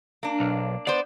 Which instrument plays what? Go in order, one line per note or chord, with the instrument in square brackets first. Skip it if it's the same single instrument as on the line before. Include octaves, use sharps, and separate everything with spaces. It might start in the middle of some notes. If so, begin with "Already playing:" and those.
[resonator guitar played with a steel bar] A#3 D4
[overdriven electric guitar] B1
[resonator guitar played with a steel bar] B3 C5 [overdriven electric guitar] D5